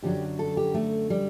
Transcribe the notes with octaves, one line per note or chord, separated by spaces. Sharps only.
F#2 D3 F#3 G4
A4
G4
A3
G3